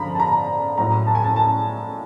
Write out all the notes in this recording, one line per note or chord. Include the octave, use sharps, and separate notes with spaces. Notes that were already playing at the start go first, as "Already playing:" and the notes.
Already playing: G2 D3 F3 A#5 B5
A5
A#5
A2 F#3 A#5
A5
G#5
A5
A5